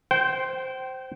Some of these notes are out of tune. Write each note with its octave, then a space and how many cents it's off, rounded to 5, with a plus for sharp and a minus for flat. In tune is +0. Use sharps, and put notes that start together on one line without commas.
C5 +0 G5 -30